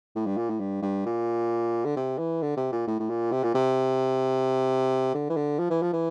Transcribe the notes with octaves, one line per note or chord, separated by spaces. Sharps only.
A2
G2
A#2
A2
G2
G2
A#2
D3
C3
E3
D3
C3
A#2
A2
A2
A#2
C3
A#2
C3
D3
E3
D3
F3
E3
F3
E3